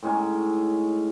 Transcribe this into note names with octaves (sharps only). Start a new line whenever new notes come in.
A2 G#3 C#4 D#4